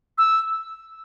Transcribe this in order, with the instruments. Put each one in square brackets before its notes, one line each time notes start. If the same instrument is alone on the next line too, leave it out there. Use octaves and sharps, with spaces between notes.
[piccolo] E6